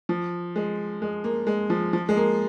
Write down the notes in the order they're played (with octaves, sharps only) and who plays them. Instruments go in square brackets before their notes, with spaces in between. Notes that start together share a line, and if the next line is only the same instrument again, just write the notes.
[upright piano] F3
G#3
G#3
A#3
G#3
F3
F3
G#3
A#3